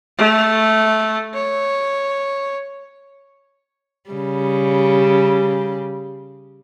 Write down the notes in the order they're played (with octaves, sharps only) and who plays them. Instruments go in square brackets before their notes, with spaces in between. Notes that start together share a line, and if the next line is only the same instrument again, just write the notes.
[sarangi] A3
C#5
[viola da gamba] C#3 G3